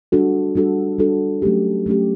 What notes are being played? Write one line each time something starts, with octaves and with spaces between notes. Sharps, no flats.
G3 D4 F#4 A4
G3 D4 F#4 A4
G3 D4 F#4 A4
F#3 A3 C#4 G4
F#3 A3 C#4 G4